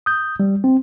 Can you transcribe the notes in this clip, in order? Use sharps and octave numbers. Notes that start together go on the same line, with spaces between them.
D#6 G6
G3
C4